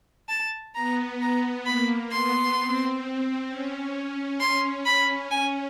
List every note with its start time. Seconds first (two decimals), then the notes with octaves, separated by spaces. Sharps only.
0.29 A5
0.75 B3 A#5
1.21 A#5
1.66 A#3 B5
2.11 B3 C6
2.57 C4
3.49 C#4
4.40 C6
4.85 B5
5.31 C#4 G#5